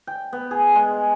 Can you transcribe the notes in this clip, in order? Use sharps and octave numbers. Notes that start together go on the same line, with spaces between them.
G5
B3
G#4
G#3